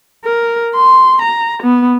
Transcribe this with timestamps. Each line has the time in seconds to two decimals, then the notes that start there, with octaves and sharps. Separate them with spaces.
0.25 A#4
0.75 C6
1.22 A#5
1.63 B3